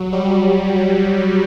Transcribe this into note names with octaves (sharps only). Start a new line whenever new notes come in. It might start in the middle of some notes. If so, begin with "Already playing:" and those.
Already playing: F#3
G3